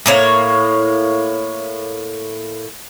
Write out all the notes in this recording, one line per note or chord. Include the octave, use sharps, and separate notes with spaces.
A2 A#3 C#5